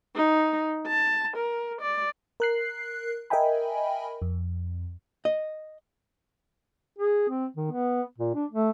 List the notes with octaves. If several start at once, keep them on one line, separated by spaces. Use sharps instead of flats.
D#4
A5
A#4
D5
A#4 F#6 C7
A#4 D#5 E5 G5 G#5 B5
F2
D#5
G#4
C4
D#3
B3
A#2
D4
A3